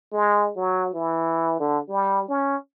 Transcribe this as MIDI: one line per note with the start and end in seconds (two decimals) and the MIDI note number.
0.12 0.50 56
0.56 0.89 54
0.94 1.59 52
1.60 1.79 50
1.89 2.28 55
2.28 2.56 61